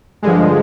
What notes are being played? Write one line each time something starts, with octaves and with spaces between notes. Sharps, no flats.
G2 D3 F3 G#3